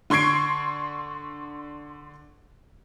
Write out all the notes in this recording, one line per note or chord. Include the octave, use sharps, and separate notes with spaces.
D3 C6 C#6 G#6 C7 D7